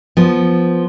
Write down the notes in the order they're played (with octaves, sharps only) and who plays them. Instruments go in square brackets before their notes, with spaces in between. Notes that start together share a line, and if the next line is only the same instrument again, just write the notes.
[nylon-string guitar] F3 B3